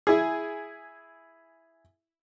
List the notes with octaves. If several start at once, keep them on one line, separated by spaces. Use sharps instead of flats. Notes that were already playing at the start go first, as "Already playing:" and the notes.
E4 G#4